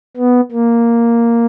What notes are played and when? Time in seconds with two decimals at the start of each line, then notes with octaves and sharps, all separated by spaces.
0.17 B3
0.52 A#3